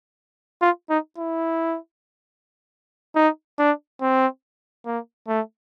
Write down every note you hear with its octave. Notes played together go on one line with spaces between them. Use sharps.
F4
D#4
E4
D#4
D4
C4
A#3
A3